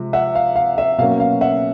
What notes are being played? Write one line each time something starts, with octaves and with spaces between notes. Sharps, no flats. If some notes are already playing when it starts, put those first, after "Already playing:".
Already playing: C3 F3 G#3
E5 F#5
F5
F5
E5
B2 F#3 A#3 C#4 F5
F5
E5 F#5